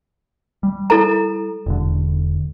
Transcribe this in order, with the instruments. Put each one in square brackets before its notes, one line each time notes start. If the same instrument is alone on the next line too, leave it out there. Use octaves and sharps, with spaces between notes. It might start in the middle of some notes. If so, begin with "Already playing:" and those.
[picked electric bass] G3
[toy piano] E4 A4 A#5
[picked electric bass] E1 D3